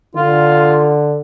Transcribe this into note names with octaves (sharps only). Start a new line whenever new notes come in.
D3 F4